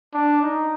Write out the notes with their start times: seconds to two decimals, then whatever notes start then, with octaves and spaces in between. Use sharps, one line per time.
0.14 D4
0.42 D#4